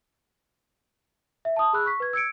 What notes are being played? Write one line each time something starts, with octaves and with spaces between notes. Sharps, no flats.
E5
A5 D#6
G#4 B5 E6 F#6
C#6 B6
B4 G#6
E6 G#6 C#7 D7